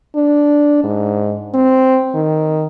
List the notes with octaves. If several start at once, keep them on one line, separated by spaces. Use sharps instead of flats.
D4
G#2
C4
D#3